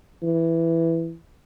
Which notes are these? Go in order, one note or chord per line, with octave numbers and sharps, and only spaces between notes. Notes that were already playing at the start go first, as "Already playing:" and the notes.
E3